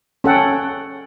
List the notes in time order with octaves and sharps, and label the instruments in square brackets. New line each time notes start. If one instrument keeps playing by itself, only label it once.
[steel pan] C#4 A4 F#5 G5